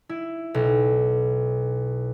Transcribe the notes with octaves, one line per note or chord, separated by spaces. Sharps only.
E4
B1